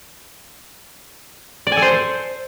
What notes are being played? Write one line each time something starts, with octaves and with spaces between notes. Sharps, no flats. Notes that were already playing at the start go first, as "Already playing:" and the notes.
D5
G#5
A4
C5